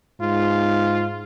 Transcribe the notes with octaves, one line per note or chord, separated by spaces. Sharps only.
G#2 F4